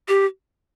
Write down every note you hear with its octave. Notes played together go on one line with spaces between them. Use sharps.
G4